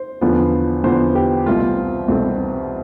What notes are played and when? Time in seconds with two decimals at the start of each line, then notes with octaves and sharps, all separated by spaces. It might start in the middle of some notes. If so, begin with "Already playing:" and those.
Already playing: C5
0.21 E2 D3 F3 B3
0.84 E2 D3 F3 B3 C5
1.15 G4
1.46 C2 B2 A3 C4 F4
2.08 C2 B2 A3 C4